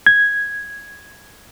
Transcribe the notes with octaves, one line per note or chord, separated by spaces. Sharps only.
G#6